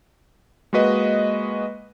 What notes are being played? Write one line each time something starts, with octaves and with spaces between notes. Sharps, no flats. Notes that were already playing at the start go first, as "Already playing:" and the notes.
G#3 A#3 F#4 B4 D#5